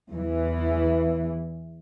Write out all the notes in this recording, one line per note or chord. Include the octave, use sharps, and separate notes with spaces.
E2 E3